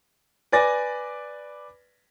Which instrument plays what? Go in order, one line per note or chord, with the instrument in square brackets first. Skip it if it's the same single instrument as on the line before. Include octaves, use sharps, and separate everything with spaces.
[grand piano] B4 D5 G#5 A6 A#6